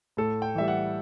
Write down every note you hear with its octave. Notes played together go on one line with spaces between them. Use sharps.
A2 A4
G5
E3 G3 E5
F#5